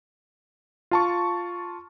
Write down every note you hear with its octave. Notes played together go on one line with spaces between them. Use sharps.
F4 A5 C#6